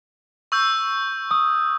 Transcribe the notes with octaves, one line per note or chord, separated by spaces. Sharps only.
C#6 E6 G6
D#6